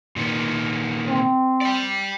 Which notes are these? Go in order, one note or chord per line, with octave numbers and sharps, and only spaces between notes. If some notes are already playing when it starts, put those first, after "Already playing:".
A#2 D#3 B3
C4
D5 G5